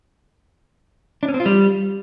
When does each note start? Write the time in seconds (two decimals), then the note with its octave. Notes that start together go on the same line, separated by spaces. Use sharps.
1.23 D4
1.28 C#4
1.34 C4
1.40 F4
1.46 G3